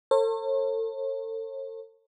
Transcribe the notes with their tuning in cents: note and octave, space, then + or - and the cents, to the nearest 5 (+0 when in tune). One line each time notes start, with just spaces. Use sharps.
A4 +40 C#5 -45